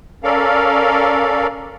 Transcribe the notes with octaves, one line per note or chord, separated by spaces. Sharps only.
C#4 A4 A#4 D5 F5